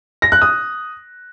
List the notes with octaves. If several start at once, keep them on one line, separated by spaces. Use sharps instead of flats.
A#6
F#6
D#6